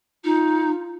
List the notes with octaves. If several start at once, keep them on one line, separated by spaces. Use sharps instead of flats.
D#4 F4